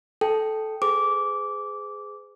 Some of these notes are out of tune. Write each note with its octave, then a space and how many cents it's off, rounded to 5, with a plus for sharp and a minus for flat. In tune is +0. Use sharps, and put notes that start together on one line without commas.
A4 -15 G5 +0
G#4 +0 C5 -45 D6 -15